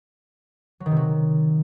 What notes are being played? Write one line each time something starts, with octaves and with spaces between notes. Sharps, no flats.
F#3
D#3
C3
F#3